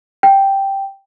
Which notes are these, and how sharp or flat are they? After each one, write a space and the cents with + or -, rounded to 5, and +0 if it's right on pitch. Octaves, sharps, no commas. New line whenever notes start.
G5 +0